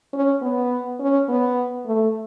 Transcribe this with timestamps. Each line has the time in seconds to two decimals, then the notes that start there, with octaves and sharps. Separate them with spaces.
0.13 C#4
0.42 B3
1.00 C#4
1.29 B3
1.86 A3